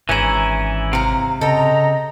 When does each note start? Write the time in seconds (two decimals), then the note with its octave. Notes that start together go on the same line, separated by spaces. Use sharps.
0.09 G#1 E3 C#4 E4 G#4 A#5
0.93 C3 F5 A#5
1.41 C#3 A4 D#5 G5 A#5